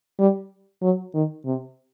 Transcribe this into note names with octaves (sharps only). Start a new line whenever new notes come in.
G3
F#3
D#3
C3